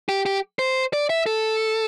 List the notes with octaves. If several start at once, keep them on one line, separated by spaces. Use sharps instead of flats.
G4
G4
C5
D5
E5
A4